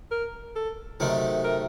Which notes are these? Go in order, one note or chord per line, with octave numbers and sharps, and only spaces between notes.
A#4
A4
C3 D#3 F#3 A3 A#4
A#4